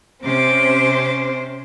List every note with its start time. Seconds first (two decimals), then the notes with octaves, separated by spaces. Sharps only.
0.23 C3 C4 C#4 C5 D6